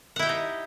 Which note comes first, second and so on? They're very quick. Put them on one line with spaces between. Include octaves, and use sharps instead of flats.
F#5 E4 G5 G4 D#4